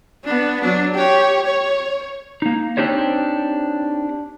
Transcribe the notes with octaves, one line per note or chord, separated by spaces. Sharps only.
B3 D4
F#3 D4
G4 C#5
C#5
A#3 D#4
C4 D4 D#4 G4 C5 C#5